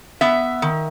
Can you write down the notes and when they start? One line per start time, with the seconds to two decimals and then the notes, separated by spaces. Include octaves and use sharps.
0.21 B3 E5
0.62 D#3